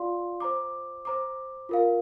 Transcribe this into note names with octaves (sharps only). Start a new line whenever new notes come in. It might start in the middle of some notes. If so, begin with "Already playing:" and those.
Already playing: F4 D5 F5 C6
C5 A#5 D6
C5 A#5 D6
F4 A#4 F5